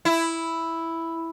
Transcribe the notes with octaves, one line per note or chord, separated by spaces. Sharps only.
E4